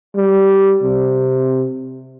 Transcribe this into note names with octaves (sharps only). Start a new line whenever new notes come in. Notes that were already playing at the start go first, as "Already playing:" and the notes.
G3
C3